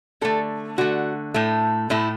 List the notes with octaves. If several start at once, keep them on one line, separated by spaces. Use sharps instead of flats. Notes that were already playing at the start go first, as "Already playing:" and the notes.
D3 A3 A4
D3 A3 F#4
A2 A3
A2 A3 E4